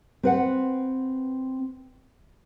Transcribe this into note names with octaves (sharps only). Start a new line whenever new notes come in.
C4 B4 F#5